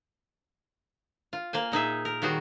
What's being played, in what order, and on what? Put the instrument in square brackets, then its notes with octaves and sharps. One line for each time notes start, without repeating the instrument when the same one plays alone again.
[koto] F4
A#3 C5 G#5
A#2 D#4 G#4 E5
A#4
D#3 G3 F#4 G#4 C5